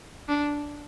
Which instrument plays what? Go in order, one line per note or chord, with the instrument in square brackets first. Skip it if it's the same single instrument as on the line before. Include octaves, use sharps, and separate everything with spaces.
[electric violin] D4